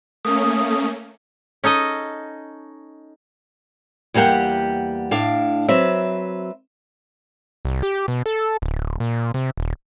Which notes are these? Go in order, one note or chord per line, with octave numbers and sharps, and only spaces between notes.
A3 A#3 C#4 D#6
C#4 D#4 A4 D#5
E2 G3 A#3 G4 F#5
A2 D4 F5
F#3 C4 B4 E5
C2
G4
B2
A4
D1
A#2
C3
D#1